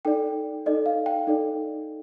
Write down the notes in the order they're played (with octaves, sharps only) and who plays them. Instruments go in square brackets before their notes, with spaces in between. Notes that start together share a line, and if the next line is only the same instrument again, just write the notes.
[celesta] D#4 A4 D5 G5
D#4 A4 D5 D#5
F5
G5
D#4 A4 D5